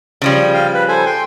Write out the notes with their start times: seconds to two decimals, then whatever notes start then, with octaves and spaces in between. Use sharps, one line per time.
0.22 C#3 F3 G3
0.54 F5 G5
0.74 B4
0.88 A4 C5 G#5
1.06 G5 C6